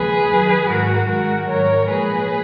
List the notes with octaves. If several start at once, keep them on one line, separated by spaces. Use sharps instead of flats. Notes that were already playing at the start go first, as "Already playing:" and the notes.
Already playing: D#2 C#3 F3 G#3 G#4 B4
F#2 D#3 F#3
G#2 D#3 F#3 F#4 A#4
F#2 D#3 G#3 F#4 A#4
G#2 D#3 F#3 A#4 C#5
A#2 F3 G#3 G#4 B4